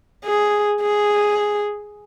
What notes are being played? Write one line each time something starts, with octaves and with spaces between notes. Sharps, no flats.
G#4
G#4